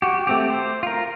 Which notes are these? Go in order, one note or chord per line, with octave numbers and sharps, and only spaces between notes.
F#4 G4
A3 C4 G4
C5
F4 A#4